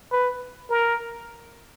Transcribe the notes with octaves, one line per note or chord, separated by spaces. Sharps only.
B4
A#4